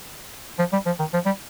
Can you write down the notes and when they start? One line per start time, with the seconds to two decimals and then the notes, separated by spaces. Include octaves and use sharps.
0.59 F3
0.73 G3
0.86 F3
0.99 D#3
1.13 F3
1.26 G3